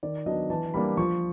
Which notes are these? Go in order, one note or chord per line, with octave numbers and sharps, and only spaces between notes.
D#3 D5
F#3 B3 D4 D#5
E3 A5
G3 A#3 D4 B5
F3 C#6